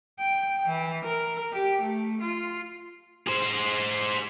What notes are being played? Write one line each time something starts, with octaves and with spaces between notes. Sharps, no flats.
G5
E3
A#4
G4
A3
F4
G#4 C5